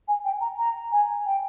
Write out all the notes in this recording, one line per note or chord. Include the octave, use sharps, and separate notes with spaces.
G#5
G5
A#5
A#5
G#5
G5